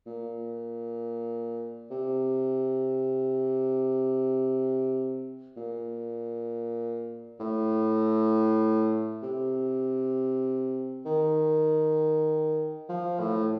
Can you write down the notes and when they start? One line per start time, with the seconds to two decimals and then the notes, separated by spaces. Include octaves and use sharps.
0.06 A#2
1.91 C3
5.57 A#2
7.40 A2
9.22 C3
11.05 D#3
12.89 F3
13.20 A2